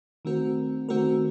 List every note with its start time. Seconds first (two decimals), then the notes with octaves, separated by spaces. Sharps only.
0.25 D#3 A3 C4 F#4 A#4
0.89 D#3 A3 C4 F#4 A#4